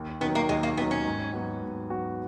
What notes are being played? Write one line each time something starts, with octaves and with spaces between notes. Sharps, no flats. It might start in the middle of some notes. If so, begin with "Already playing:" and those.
Already playing: D#2
D#3 F#3 B3
A#3
D#2 G#3
A#3
D#3 F#3 B3
C#4
G#2
F#3 B3 F#4
G#2
F#3 B3 F#4